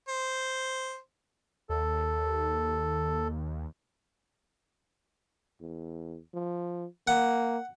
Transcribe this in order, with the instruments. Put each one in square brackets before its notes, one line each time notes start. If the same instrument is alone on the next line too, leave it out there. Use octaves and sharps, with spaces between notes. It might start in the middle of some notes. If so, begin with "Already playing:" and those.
[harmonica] C5
[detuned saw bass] D#2 [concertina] A4
[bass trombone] E2
F3
[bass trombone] A#3 [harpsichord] F#5